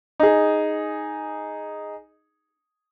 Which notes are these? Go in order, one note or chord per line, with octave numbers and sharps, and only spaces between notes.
D#4 G#4